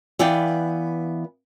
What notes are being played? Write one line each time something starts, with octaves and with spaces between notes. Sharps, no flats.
E3 B3 D5 F5 G5